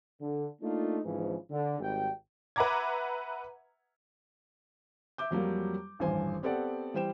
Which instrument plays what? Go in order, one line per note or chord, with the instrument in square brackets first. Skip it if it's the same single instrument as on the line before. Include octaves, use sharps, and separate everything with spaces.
[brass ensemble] D3
A3 A#3 D4 D#4 F4
G#1 G#2 C#3 E3 F3
D3
G#1 G3 G5
[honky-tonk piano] B4 E5 F#5 A#5 D6 G#6
[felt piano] E5 D6 G6
F2 F#3 G3 A#3
D#1 A1 G2 C5 G#5
B3 C4 G4 A4 D5 F#5
E3 G3 C5 G5 E7